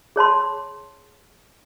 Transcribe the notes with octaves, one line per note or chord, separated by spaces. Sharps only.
G#4 C#5 A5 C6